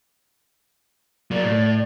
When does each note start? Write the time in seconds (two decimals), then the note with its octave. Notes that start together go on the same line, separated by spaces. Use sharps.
1.31 F#3 A#3 D5
1.44 A2